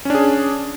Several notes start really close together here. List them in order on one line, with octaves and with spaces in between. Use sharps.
C#4 D4 G#4